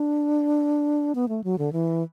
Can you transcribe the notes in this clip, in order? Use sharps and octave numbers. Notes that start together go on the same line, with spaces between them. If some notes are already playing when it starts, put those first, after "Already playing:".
Already playing: D4
B3
A3
F#3
D3
E3